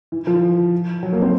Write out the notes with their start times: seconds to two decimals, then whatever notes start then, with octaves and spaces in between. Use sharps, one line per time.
0.12 E3
0.27 F3
1.03 F#3
1.13 A#3
1.22 C4